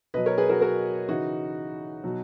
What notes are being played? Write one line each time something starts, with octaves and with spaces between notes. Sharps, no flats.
B2 F#3 B4 D#5
A#4 C#5
G#4 B4
F#4 A#4
F#4 A#4
C#3 E3 D#4 F#4
B2 F#3